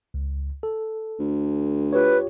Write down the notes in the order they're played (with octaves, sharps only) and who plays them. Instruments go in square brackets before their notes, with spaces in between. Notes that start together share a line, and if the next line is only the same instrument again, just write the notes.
[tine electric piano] C#2
A4
[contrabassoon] D2
[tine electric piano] F4 G4 C#5 [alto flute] B4